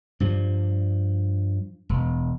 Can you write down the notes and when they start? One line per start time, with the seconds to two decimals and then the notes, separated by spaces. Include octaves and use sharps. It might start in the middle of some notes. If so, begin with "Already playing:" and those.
0.20 G2 F3
1.89 E1